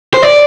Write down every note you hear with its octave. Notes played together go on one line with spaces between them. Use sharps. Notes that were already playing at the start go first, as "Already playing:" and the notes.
C5
D5